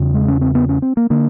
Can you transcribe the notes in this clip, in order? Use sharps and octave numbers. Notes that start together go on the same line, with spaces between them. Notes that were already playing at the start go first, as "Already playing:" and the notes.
Already playing: E2 C#3
G#3
C#4
C4
B3
C#4
C4
A#3
D3 A#3